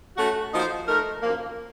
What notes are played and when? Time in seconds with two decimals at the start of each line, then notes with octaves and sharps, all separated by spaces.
0.17 A3 C#4 F#4
0.53 F3 A#3 D#4 F#4 C5
0.87 A3 D#4 A#4
1.23 F#2 F3 A#3